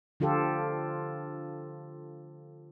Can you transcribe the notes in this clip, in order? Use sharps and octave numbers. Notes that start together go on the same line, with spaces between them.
D3 F3 F4 G4 A4